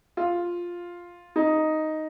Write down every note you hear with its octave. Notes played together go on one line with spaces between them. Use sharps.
F4
D#4